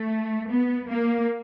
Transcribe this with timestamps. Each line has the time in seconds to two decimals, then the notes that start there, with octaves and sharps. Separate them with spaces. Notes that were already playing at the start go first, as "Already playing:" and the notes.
Already playing: A3
0.50 B3
0.89 A#3